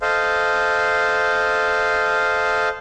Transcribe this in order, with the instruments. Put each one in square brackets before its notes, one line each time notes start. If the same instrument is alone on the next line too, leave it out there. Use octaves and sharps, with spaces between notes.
[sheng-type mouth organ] A4 C5 D#5 F5